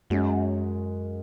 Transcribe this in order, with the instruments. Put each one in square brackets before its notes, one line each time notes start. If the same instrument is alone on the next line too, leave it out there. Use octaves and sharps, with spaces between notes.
[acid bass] F#2 [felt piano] G#3 C#4 F#4